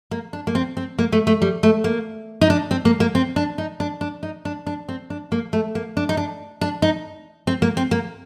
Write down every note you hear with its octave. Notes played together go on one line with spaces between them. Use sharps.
A#3
D4
A#3
C4
C4
A#3
A3
A3
G3
A3
A#3
D#4
D4
C4
A#3
A#3
C4
D4
D#4
D4
D4
D#4
D4
D4
C4
D4
A#3
A3
A#3
D4
D#4
D4
D4
D#4
C4
A#3
C4
A#3